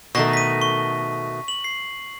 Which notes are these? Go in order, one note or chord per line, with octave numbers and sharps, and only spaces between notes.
B2 D#3 A3 C#6 A#6
B6 D#7
C#6
F#7
C7